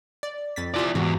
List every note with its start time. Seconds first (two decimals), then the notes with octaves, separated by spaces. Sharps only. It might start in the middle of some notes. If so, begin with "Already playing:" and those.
0.23 D5
0.56 F2 A6 B6
0.74 C3 E4 F4 G4 D5
0.95 E2 G#2 F#4